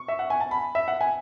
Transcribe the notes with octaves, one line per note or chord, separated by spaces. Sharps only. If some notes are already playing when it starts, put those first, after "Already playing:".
Already playing: C#6
E5
F#5
G#5
A5
B5
E5
F#5
G#5